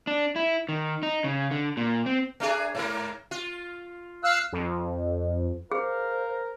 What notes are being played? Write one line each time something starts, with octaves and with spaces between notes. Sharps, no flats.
D4
E4
D#3
D#4
C#3
D3
A#2
C4
A3 D4 G#4
G#2 A#3 A#4
F4
F5 E6 F#6
F2
G#4 A#4 C5 F5